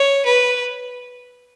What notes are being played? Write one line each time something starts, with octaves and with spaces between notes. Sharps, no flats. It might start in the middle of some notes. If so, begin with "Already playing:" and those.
Already playing: C#5
B4